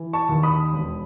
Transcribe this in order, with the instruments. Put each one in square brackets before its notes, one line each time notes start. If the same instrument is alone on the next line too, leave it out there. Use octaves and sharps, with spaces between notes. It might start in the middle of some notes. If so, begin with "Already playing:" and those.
Already playing: [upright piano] E3
A5 C#6
D#2
B5 D#6
E1